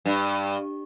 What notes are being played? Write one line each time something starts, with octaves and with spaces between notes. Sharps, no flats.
G2